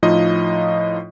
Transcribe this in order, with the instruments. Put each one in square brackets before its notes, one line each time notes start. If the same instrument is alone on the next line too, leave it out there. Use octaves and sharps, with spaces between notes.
[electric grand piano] A2 F3 D#4 F4 D#5